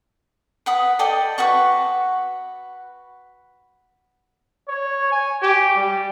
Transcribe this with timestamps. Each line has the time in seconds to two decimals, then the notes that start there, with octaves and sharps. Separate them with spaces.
0.66 B4 F#5 D#6
0.99 A4 D5 D#5 G5
1.38 F#4 B4 F#5 C#6
4.68 C#5
5.12 G#5
5.42 G4
5.76 G3